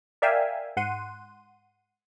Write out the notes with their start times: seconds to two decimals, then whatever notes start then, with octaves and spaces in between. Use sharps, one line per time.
0.22 A#4 D5 E5 F5 G5 G#5
0.77 G#2 F#5 C6 D#7